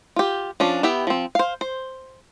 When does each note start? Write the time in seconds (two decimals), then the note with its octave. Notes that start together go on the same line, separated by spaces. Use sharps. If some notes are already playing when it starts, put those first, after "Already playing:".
0.16 F4 G4
0.60 F3 C#4 D4
0.83 B3 E4 G4 E5 G5
1.07 F3 C4
1.35 C5 F5
1.61 C5